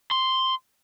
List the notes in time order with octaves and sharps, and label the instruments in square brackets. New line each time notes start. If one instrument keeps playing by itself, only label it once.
[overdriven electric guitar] C6